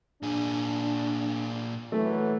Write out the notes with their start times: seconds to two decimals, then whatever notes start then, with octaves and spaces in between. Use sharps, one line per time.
0.23 A#2 D4 G#4
1.92 E3 F#3 A3